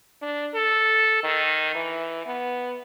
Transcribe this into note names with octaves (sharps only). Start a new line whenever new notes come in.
D4
A4
D#3
E3
B3